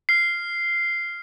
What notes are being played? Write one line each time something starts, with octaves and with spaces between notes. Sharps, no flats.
F6 C7